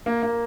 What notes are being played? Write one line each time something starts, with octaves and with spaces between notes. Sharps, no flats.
A#3
A#3